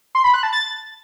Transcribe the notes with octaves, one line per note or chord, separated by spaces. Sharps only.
C6
B5
F#6
A5
A6